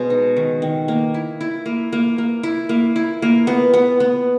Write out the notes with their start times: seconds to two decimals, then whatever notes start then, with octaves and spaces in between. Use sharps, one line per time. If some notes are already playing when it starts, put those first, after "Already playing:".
Already playing: B2 G#3
0.10 D#4
0.37 D#3
0.62 D#3
0.88 A#3
1.14 E4
1.41 E4
1.66 A#3
1.93 A#3
2.18 A#3
2.43 E4
2.69 A#3
2.96 E4
3.22 A#3
3.47 B3
3.74 B3
4.00 B3